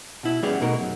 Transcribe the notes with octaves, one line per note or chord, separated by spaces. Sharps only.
B2 E4
G3 B3 C#4 G4 G#4
B2 A3 D#4 G#4 A#4
F#2